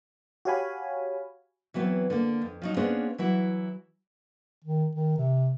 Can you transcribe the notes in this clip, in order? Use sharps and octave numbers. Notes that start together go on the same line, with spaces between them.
F#4 G4 C#5 F5 G#5 B5
E3 F#3 B3 C4
D3 A#3
F2
F3 F#3 D#4
A#3 B3 C#4 D4 G#4 C5
E3 F#3 E4
D#3
D#3
C3